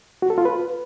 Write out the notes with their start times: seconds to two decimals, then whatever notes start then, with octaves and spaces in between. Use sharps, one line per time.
0.22 F#4
0.30 A4
0.38 F4
0.45 B4